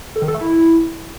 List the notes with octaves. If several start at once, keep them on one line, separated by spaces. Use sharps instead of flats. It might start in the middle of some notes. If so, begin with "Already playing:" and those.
A4
D#3
A4
A3
E4